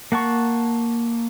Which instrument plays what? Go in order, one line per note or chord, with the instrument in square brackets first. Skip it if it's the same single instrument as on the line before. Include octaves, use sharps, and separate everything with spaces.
[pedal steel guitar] A#3 F#5 A5 C#6